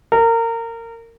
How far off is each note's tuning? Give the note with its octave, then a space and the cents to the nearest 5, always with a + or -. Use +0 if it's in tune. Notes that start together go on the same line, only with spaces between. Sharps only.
A#4 -25